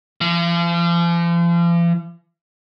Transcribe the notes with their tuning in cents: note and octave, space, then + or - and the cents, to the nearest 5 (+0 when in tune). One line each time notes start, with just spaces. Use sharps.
F3 -40